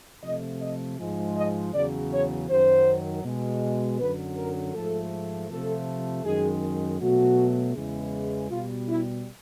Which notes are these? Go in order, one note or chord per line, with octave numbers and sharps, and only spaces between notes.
C3 F3 A3 D#5
D#5
G#2 F3 G#3
D#5
E2 C#3 F#3 D5
C#5
F#2 D#3 F#3 C5
B2 G#3
F#2 D3 F#3 B4
A#4
G#2 F3 A3 A4
C3 F3 A3 A4
F#2 D#3 G#3 G#4
B2 F#3 A3 F#4
E2 C#3 E3 G#3
B2 G3 F4
E4